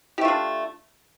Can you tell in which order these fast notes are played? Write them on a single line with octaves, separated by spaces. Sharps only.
G4 A3 F4 D4